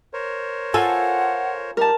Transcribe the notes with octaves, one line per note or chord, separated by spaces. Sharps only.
A#4 C5 C#5
F4 A4 F#5 G#5
G3 D#4 G4 A#4 A5